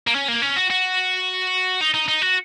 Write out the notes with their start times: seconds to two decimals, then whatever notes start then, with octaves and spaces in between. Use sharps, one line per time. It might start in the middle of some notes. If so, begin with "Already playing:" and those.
0.07 A#3
0.15 C#4
0.28 A#3
0.42 C#4
0.56 F#4
0.70 F#4
1.81 D#4
1.94 D#4
2.08 D#4
2.22 F#4